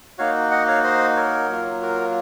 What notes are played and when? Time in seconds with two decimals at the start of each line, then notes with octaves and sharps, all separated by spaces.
0.18 A#3 D#4 F#4 C#5 F5
0.51 D#5 F#5
0.67 C#5 F5
0.84 C5 D#5
1.16 A#4 C#5
1.49 F#3 A#3 F4
1.82 F#4 A#4